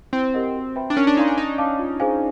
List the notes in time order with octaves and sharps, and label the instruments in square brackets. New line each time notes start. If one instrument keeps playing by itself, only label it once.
[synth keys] C4 [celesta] E4
[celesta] G4 A#4 D#5 F#5
F#4
B4 E5 G5 B5
[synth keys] D4
[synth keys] C#4 [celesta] A#4
[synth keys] D4
[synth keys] D#4 [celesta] D5 F5 G#5 C6
[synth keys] D4
[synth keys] D#4 [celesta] C#5
[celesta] F5 A5 D6
F4
G#4 C5 F5 G#5